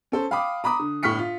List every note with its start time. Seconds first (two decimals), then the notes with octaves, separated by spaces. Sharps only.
0.12 C#4 A4 C5
0.31 F5 G5 B5 D6 D#6
0.64 A#5 B5 D6 D#6
0.80 D3
1.03 G1 A2 C#6 F6 B6 C#7
1.19 F4